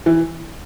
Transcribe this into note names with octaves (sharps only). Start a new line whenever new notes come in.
E3